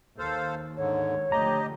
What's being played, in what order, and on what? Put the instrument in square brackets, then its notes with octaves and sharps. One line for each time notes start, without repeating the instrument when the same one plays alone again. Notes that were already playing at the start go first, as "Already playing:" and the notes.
[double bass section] D#2 [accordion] A4 C5 F5
[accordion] G#2 D3 [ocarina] C#5
[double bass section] D3 F3 A3 [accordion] G4 D#5 [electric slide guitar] A#5